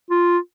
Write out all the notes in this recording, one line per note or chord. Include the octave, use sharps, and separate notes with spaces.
F4